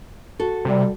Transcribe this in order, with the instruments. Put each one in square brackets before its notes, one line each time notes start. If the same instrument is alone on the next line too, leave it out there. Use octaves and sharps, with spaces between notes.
[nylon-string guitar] F#4 A4
[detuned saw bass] C3 [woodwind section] G3